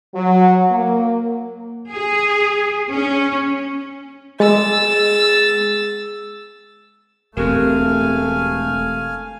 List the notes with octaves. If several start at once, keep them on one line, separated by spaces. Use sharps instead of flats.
F#3
A#3
G#4
C#4
G#3 G#4 E6 A6
E1 E2 A3 C4 G4 A#4 F5 G#5